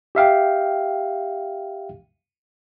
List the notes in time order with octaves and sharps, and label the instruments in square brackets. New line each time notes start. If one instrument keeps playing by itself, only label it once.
[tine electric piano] G4 E5 F5 G5